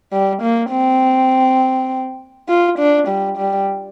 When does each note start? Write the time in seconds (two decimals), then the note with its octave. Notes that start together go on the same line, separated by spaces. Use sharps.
0.12 G3
0.42 A#3
0.71 C4
2.49 F4
2.78 D4
3.08 G3
3.38 G3